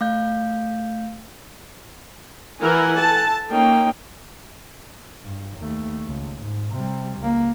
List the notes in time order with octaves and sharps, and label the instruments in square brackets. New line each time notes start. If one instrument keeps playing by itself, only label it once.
[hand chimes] A3 F5 G6
[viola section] E3 E4 A#4 [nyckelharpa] F#5 G#5
[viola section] A4 A5
[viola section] A#3 C#4 [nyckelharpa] D#4 G5
[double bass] G2
D#2 A3
C#2
G#2
C3 G3
C#2 A#3